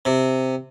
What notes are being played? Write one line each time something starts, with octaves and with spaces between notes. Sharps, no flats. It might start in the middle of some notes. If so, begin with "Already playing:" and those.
C3